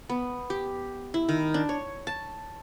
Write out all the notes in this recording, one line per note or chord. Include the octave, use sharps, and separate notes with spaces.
B3
G4
E4
D#3
D4
C#5
A5